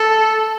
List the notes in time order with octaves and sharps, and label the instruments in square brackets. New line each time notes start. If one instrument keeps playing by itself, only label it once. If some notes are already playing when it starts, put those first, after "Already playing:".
Already playing: [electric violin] A4